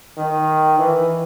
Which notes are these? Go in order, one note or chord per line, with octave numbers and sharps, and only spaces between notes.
D#3
E3